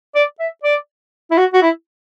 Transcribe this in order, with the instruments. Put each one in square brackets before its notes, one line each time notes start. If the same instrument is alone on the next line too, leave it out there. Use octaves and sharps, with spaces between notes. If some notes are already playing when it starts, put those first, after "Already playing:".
[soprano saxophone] D5
E5
D5
E4
F#4
F#4
E4